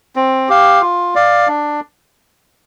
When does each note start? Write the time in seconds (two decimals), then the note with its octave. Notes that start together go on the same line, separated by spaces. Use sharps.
0.16 C4
0.49 G4 F5
0.81 F4
1.15 D5 F5
1.47 D4